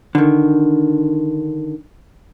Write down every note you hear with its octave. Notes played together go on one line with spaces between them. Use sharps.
D3 D#3